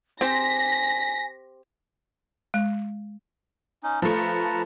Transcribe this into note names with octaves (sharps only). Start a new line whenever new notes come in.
C4 G4 C5 G#5 A#6 B6
G#3
C#4 D#4
F3 A3 B4 A5 A#5